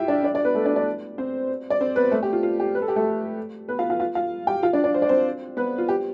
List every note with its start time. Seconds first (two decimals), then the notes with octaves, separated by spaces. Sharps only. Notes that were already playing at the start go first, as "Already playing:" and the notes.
Already playing: E4 F4 G4 E5 G5
0.08 D4 D5
0.23 D4 D5
0.34 D4 D5
0.45 B3 B4
0.55 A3 A4
0.66 D4 D5
0.76 D4 D5
1.18 C4 C5
1.70 D5
1.81 C4 C5
1.96 B3 B4
2.11 A3 A4
2.23 G4
2.33 F4
2.43 F4
2.60 G4
2.75 B4
2.82 A4
2.88 G4
2.96 A3 A4
3.68 B3 B4
3.79 F4 F5
3.89 F4 F5
4.00 F4 F5
4.15 F4 F5
4.47 G4 G5
4.63 F4 F5
4.73 D4 D5
4.84 D4 D5
4.94 C5
5.02 D5
5.09 C4 C5
5.57 B3 B4
5.78 F4
5.88 G4